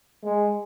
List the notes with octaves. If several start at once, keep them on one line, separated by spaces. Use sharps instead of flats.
G#3